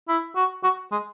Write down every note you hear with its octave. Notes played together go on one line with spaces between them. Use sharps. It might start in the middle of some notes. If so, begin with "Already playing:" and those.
E4
F#4
F#4
G#3